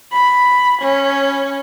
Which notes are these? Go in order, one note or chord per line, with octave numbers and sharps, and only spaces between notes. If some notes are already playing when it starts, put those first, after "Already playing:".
B5
C#4